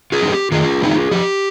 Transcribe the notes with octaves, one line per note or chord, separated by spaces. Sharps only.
F4 G#4
G3 C4 D#4
G4
D#3 F4 G#4
G3 C4 D#4
F3 G4